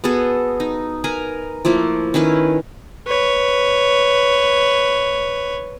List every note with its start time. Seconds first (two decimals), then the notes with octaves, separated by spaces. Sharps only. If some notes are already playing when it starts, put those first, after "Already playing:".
0.04 B3 F#4 G#4 A4
0.60 D#4
1.04 A#4 B4 G#5 A#5
1.65 F3 A3 A#3 E4
2.14 D#3 C#4 E4 B4
3.07 B4 C#5